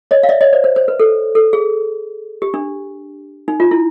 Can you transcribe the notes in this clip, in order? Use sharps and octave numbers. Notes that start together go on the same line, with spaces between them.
C#5 D#5
F5
D5 E5
C#5 D#5
C5 D5
C5
C5
B4
A4
A4
G#4
G4
D4
D#4
F4
E4